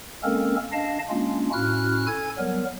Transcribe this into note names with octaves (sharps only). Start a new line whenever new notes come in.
G#3 A#3 C4 C#4 A4 A#4
D4 D#5 F5 A5
G#3 A#3 C#4 D4 F4
A2 C#4 E4 F#4 F6 F#6
A4 G#5 G#6
F#3 G3 B3 A#4